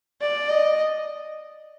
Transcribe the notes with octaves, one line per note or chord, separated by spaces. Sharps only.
D5
D#5